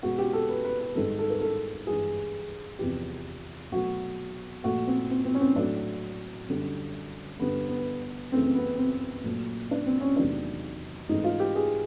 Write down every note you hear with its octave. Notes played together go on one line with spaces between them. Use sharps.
B2 G#3 F#4
G4
A4
B4
B4
B4
G#2 D#3 G3 A4
A4
A#4
A4
G2 E3 G#3 G#4
E2 C3 F3 G4
B2 F#3 A3 F#4
A#2 F3 A3 F#4
C4
C4
C4
C#4
C4
A2 F#3 A3 D4
F#2 D3 G3
G2 D3 G3 B3
B3
F#2 C#3 E3 A3 C4
C4
B3
C4
A#2 F#3 A3
D4
C4
C#4
E2 C3 D#3 F#3 A3 D4
G#2 E3 A3 D#4
F4
G4
G#4